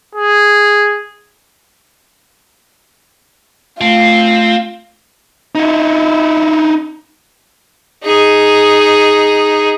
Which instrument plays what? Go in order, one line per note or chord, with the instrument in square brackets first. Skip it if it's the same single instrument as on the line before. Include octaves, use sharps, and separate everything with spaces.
[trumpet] G#4
[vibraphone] A3 [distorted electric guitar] C4 [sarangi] F4
[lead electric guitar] D#4 E4
[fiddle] D#4 G#4